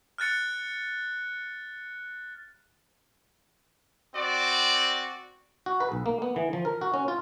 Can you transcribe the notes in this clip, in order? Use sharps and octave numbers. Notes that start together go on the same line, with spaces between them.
F6 F#6 A6 C#7
C4 F#4 D5
F#4
B4
B1
A#3
B3
E3
F3
A#4
F#4
C#4
F4